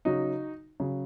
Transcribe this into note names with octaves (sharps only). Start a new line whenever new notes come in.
C#3 F#3 D#4 F#4
C#3 F#3